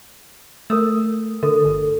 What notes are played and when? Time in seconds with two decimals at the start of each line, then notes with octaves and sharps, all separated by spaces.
0.70 A3 A#4 D#6 E6
1.43 D3 A4 A#4
1.65 G1